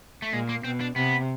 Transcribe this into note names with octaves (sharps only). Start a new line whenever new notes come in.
A3
A#2 G#3
A#3
B2 C4
D4
C3 B3